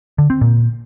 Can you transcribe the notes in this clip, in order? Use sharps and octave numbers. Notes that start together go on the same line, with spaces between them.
D3
C4
A#2